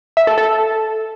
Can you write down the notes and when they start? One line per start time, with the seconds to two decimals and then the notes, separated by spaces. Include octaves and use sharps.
0.17 E5
0.27 A4
0.38 A4